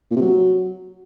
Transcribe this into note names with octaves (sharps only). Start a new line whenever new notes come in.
A#2
C3
F#3